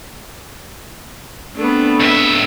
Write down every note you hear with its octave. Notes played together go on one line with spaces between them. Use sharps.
A3 B3 C4 D4
C#2 E5